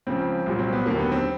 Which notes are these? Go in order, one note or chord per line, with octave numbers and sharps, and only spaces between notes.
C#2 C#3 F3 C4
C2 A#2 F#3
C4
B3
D#2 D3 F#3 A#3
B3
C4